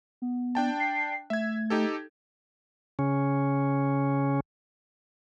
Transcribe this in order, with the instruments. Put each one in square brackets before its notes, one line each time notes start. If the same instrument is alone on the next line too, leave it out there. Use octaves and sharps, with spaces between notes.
[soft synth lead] B3
[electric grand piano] D4 G5 A5
[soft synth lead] C7
[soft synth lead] A3 [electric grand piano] E5 G#6
[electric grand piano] D#4 G4 A4
[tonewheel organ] C#3 C#4